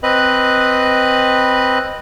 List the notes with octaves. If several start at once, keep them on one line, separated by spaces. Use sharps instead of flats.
C4 B4 D#5 F#6